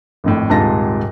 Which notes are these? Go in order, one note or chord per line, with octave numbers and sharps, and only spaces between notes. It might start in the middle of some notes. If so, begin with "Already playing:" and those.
G#1 F2 A2
D#1 G#2 C3 F4 A5 A#6